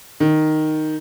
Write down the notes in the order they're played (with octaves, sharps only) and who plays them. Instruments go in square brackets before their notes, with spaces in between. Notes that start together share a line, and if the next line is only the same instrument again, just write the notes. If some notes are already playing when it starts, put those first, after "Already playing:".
[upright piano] D#3